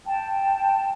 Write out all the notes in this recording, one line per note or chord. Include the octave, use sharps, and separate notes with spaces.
G5 A5